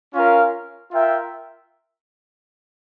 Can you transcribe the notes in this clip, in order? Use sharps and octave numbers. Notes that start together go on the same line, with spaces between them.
C#4 F4 A#4 F5
F4 A#4 E5 G5